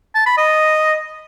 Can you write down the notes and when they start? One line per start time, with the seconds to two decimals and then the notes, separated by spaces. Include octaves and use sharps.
0.15 A5
0.26 B5
0.38 D#5